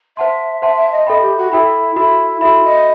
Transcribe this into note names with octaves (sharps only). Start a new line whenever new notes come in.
C5 E5 F#5 A5 C6
C5 E5 F#5 A5 C6
E5
D#5
A4 D#5 E5 G5 B5
G4
F#4
E4 A4 E5 G5 B5
E4 F#4 A4 E5 B5
E4 F#4 A4 E5 B5
D#5